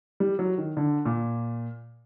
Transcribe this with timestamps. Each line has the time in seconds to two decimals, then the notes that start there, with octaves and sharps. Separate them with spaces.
0.20 G3
0.39 F#3
0.58 D#3
0.77 D3
1.06 A#2